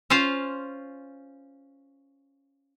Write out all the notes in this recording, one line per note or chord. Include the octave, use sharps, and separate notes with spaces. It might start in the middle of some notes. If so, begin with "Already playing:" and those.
C#4 F4 C5 F5